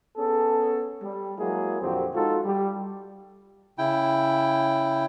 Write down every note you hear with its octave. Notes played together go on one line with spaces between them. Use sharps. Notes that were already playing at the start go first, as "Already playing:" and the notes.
B3 C#4 G#4 A4
G3
F#3 G#3 A#3 E4 G#4
F2 A#2 D3 C4 F#4 G4
G#3 D#4 F4 F#4 A4
G3
C#3 E4 G5